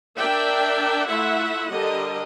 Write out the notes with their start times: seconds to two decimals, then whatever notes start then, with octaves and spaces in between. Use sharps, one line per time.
0.17 D4 A#4 D5 E5 G5
1.09 A3 E4 F4 E5 F#5
1.71 D3 G3 A#4 D#5